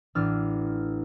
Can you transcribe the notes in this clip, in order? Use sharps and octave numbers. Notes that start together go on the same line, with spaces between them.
A1 D4 A4 F6